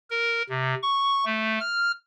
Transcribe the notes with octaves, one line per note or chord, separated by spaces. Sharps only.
A#4
C3
C#6
A3
F6